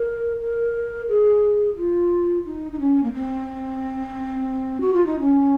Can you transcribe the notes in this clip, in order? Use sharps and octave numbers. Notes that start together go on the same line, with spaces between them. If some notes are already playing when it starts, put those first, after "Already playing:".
Already playing: A#4
A#4
G#4
F4
D#4
D#4
C#4
A#3
C4
F#4
F4
D#4
C#4